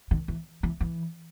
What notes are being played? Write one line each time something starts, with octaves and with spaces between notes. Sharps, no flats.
D#3
E3
E3
E3